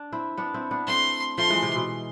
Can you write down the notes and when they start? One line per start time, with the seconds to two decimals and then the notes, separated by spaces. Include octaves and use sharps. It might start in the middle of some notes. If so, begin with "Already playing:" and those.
Already playing: D4
0.12 C4 E4
0.37 B3 D4
0.54 C4 E4
0.71 B3 D4
0.87 A3 C4 C6
1.38 F3 A3 C6
1.50 E3 G#3
1.63 C3
1.75 B2